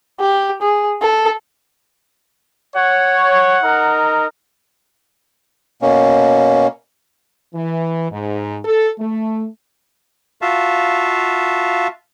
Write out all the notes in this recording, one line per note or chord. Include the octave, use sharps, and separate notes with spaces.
G4
G#4
A4
C#5 F#5
D#4 A#4
B2 A#3 C#4
E3
G#2
A4
A3
F4 F#4 E5 F5 A5